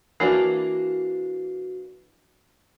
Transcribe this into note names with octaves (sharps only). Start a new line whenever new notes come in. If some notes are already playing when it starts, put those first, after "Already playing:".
E3 A#3 D4 F#4 C7